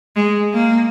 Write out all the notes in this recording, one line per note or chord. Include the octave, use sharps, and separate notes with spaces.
G#3
A#3